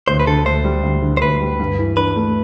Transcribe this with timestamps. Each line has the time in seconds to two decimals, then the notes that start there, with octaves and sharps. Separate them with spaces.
0.08 D2 C5
0.20 B4
0.27 D3 A4
0.45 D2 C5
0.64 G3
0.83 D2
1.02 D3
1.17 C5
1.22 D2 B4
1.41 G3
1.60 G2
1.79 E3
1.97 D4 B4
2.16 A3